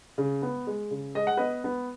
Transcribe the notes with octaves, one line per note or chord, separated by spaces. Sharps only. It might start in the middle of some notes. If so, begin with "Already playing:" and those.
C#3
B3
G#3
C#3
G#3 D#5
F#5
B3 B4 D#5
B3